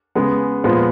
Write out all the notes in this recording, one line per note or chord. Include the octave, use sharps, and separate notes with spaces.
C#3 G#3 B3
A#2 F3 G#3 B3